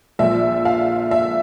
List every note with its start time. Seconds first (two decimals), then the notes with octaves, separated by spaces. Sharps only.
0.19 A#1 A#2 F3 E5
0.65 F5
1.11 E5